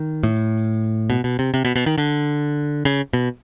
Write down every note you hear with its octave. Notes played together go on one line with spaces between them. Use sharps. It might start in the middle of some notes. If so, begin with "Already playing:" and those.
Already playing: D#3
A2
B2
B2
C3
C3
B2
B2
D#3
D3
C#3
B2